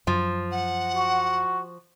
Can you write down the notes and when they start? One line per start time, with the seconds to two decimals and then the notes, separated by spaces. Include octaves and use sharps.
0.07 F#2 F3
0.51 F#5
0.96 F#4